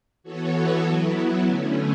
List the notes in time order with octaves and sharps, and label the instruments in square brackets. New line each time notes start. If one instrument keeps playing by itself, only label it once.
[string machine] E3 B3 F#4 A4 C#5
F#3 B3 E4
D3 A3 C#4